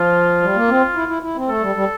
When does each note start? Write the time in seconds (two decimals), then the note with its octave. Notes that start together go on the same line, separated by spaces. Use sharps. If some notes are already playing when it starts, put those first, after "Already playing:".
Already playing: F3 F4
0.42 G3
0.56 A#3
0.68 C4
0.95 E4
1.08 E4
1.23 E4
1.36 C4
1.48 A3 A4
1.62 G3
1.75 G3